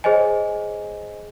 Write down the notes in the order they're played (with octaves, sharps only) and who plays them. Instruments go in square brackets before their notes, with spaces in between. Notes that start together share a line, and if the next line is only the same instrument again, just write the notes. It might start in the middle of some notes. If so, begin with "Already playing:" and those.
[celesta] G#4 C5 C#5 D#5 G#5